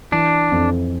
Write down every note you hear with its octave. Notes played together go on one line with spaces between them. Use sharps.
E3 D4
F2